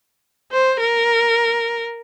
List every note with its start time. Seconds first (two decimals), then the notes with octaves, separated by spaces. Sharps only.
0.52 C5
0.80 A#4